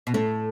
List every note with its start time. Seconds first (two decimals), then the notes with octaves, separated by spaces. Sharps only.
0.07 B2
0.13 A2 A3